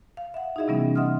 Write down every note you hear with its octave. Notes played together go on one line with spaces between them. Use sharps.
F5
E5 F#5
D#4 E4 F#4 G#4 D#5 E5
C3 E3 G3 B3 C#4
D#5 E5 F#5 C6 D#6 F6